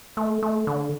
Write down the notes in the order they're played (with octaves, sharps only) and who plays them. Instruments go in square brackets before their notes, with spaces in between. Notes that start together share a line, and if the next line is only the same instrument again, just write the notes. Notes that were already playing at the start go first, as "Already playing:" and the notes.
[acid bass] A3
A3
D3